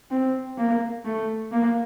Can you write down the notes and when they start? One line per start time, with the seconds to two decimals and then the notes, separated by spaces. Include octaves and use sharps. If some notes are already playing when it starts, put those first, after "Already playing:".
0.11 C4
0.58 A#3
1.05 A3
1.52 A#3